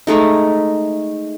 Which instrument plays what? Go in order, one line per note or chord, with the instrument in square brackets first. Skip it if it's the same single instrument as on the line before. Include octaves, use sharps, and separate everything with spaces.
[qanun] G#3 A3 D#4